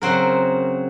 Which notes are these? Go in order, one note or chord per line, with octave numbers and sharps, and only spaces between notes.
F#2 C#3 C4 F#4 A#4